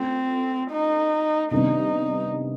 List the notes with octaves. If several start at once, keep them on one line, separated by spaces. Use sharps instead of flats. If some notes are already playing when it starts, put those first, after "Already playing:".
Already playing: A3 C4 C#4 F4 A4
D#4
C3 D#3 G3 B3 D4 D#4